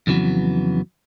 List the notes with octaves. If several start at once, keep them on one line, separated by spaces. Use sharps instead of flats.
F2 C#3 E3 F#3 B3